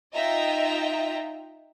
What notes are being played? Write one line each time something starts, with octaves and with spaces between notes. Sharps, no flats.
D#4 F4 D#5 E5 G5 A#5